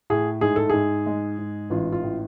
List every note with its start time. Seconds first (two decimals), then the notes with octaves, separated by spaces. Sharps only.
0.10 A2 G#4
0.41 G#2 G#4
0.56 A4
0.70 G#2 G#4
1.06 G#3
1.38 G#2
1.70 A1 F4
1.92 F4
2.03 A2